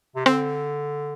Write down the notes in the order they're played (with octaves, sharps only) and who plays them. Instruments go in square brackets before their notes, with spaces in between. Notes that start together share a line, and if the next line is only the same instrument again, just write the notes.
[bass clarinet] C3
[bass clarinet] D3 [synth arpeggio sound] C4